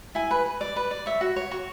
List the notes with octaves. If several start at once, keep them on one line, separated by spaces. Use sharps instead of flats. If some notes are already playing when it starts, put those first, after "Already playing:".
E4 G#5
B4
B4
D5
B4
D5
C#5 E5
F#4
C#5
F#4 C#6